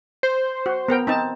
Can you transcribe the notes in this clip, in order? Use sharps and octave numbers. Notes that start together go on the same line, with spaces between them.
C5
F#4
B3 A#4 G5
C4 D#4 A5